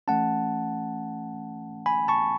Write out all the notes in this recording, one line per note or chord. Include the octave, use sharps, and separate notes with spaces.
E3 A3 C#4 F#5 A5
G#5 B5
A5 C#6